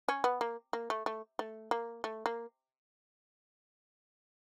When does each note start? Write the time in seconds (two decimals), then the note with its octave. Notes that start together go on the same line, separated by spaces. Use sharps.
0.09 C#4
0.24 B3
0.41 A#3
0.73 A#3
0.90 A3
1.06 A3
1.39 A3
1.71 A#3
2.04 A3
2.26 A#3